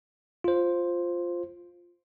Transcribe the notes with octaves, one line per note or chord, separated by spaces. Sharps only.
F4 C5